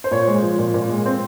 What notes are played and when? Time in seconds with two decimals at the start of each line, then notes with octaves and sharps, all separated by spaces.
0.04 C5
0.11 A#2 C#5
0.27 G#3
0.43 F3
0.59 A#2
0.74 A#2
0.90 G#3
1.06 C4